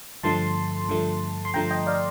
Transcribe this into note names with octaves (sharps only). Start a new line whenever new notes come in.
G2 D3 F3 A3 A5 C6
G2 D3 F3 A3
C6
G2 D3 F3 A3 G5 A#5
D#5 G5
D5 F5